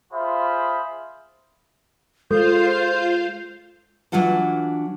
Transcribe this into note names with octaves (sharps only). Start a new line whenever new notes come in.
F4 G#4 C5 E5 B5
G#3 F4 A4 C5 F5 G6
E3 F#3 D4 F4 F#5 A5